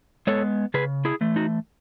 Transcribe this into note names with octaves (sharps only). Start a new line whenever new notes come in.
G#3 B3 A4 C#5
C#3 G#4 B4
E4 G#4
E3 A3
D#4 F#4